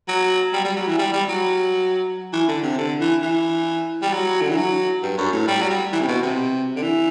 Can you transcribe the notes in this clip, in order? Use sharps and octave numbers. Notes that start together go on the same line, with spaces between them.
F#3
G3
G3
F#3
E3
G3
G3
F#3
E3
D3
C3
D3
E3
E3
G3
F#3
D3
E3
F#3
G2
F#2
A2
G3
F#3
G3
E3
C3
B2
C3
D3
E3